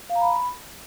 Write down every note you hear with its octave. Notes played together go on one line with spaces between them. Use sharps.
F5
A#5
B5